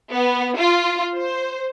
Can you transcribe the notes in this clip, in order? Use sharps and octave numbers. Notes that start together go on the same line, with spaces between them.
B3
F4
C5